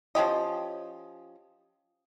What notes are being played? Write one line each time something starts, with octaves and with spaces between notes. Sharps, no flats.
F3 C#4 G4 D#5